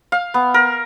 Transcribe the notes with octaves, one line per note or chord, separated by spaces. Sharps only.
F5
B3
A#4